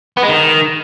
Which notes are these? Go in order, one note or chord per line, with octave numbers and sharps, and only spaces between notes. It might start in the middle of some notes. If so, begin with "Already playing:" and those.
B3
G#3
D#3